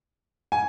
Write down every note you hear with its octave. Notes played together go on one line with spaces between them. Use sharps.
G#5